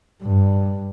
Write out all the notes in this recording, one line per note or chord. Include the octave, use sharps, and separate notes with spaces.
G2